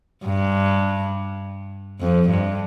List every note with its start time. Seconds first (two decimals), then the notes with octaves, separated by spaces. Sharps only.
0.25 G2
2.00 F2
2.30 G2